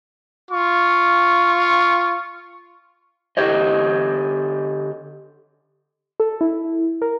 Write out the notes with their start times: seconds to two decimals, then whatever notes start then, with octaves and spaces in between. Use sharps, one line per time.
0.50 F4 C#6
3.37 D3 G4 C#5 D#5
6.20 A4
6.41 E4
7.02 A#4